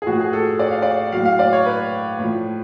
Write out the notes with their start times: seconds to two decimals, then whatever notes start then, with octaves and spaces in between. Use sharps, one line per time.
0.02 G#4
0.06 A2 F3 F#4
0.20 G#4
0.33 A4
0.59 D5
0.71 F5
0.82 D5
1.12 A2 F#3 F5
1.25 F5
1.39 D5
1.53 C#5
1.66 B4
2.19 A2 F3